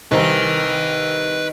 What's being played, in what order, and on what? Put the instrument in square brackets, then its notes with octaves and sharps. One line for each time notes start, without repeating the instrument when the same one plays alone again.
[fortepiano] C2 C4 A#4 [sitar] D#3 [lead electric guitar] B4 G#5